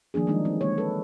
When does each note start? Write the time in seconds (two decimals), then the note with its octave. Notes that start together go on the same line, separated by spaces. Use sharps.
0.14 D#3 F3 A#3 D4 G#4
0.27 D#3 E3 G3 G#3 D4 D#4
0.45 C4
0.61 D3 D#3 G#3 A#3 C#5
0.78 A4 B4